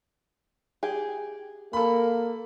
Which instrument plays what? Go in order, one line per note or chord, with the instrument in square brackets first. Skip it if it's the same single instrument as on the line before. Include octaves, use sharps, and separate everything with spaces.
[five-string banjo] G4 G#4
[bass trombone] A#3 [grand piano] A4 B5